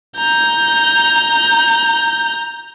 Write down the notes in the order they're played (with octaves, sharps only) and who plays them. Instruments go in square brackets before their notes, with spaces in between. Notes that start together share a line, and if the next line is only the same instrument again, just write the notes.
[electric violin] A#5 G6